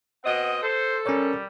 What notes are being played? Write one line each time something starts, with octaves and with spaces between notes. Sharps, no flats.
B2 C4 D#5 F#5
A4 C5
G3 C#4 A#4 C#5